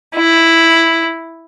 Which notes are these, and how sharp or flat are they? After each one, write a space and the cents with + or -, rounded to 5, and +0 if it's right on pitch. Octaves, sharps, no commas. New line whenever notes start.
E4 +0